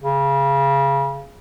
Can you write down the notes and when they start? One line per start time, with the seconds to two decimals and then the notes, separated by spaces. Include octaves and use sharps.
0.02 C#3